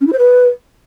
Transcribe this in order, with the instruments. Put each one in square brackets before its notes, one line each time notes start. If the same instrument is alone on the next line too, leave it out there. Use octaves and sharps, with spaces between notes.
[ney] C#4
E4
C5
B4